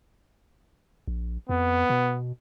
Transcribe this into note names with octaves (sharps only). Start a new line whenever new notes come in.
A#1
F2 B3
B2